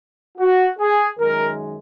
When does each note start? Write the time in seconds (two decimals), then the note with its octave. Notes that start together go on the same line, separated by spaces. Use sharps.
0.38 F#4
0.78 G#4
1.18 F#2 D#3 G#3 A#4